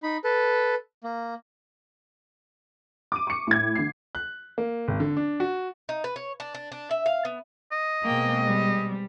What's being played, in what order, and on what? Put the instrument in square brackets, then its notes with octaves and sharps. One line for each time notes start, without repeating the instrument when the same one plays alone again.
[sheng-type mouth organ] D#4 B5
A4 B4
A#3
[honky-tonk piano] D6 D#7
C#6 C#7
A2 G#6
D3 C7
[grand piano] F#6
A#3
G#1
D3
D4
F#4
[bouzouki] D#4
B4
C#5
D4
D4
D4
E5
F5
B3
[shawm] D#5
[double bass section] B2 G#3 C4 [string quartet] A#3 G5
[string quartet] G3